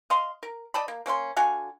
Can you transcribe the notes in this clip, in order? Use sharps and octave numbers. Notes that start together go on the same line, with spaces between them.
D#5 F5 C6
A#4
D5 D#5 A5 B5
A#3
A#3 C#4 F5 C6
D3 F#4 F5 G#5